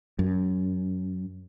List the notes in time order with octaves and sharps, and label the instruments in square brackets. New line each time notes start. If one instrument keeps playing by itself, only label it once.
[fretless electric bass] F#2